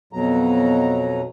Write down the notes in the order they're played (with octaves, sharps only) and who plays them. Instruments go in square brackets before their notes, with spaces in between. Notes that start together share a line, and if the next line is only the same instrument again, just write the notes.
[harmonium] F2 B2 F#3 A#5